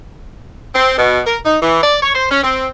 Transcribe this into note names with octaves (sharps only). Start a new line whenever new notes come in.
C4
B2
A#4
D#4
E3
D5
C#5
C5
C#4
C4